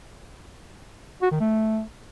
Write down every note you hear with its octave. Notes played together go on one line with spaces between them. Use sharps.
F#4
D#3
A3